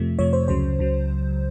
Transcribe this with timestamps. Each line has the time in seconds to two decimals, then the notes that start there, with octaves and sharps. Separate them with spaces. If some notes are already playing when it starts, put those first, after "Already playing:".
Already playing: F2 C3 F3 A3
0.18 F2 C3 F3 A3 C#5
0.33 C5
0.48 C#2 C#3 F#3 C5
0.79 C#2 C#3 F#3